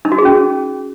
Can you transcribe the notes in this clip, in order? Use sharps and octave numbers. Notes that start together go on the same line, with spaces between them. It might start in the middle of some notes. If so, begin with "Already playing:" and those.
D#4
F#4
G#4
C#4